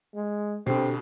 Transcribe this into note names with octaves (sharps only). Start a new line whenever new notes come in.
G#3
B2 D3 C4 G4 C7